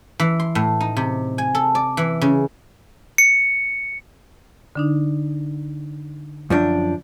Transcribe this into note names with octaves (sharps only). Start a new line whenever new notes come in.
E3
C6
A2
D#4
C3
G#5
A4
D5
E3
C#3
C#7
D3 D4 D#4
F#2 F3 D4